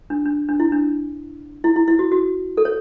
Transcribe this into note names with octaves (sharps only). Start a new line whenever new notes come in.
D4
D4
D4
E4
D4
E4
E4
E4
F#4
F#4
A4
C#5